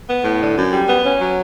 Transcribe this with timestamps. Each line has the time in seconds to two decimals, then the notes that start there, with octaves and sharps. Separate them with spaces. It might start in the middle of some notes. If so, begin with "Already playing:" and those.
0.08 B3
0.24 A2
0.40 D3
0.56 F#2
0.72 G3
0.89 B3
1.05 C#4
1.20 F#3